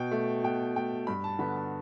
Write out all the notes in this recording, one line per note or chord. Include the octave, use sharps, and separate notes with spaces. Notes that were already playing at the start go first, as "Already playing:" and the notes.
Already playing: B2 G5
A3
B2 G5
A3 G5
G2 B5
A5
D3 B3 B5
A5